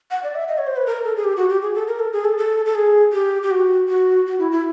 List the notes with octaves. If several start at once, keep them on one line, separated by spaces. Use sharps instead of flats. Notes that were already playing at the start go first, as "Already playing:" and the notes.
F#5
D5
E5
D#5
C#5
C5
B4
A#4
A4
G#4
G4
F#4
G4
G#4
A4
A#4
A4
G#4
A4
A4
A4
G#4
G4
G4
F#4
F#4
F#4
E4
E4